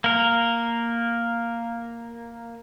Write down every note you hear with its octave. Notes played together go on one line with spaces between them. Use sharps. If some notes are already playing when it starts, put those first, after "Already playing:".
A#3 A#4